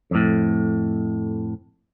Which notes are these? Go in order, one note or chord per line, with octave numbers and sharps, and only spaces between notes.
F2 A2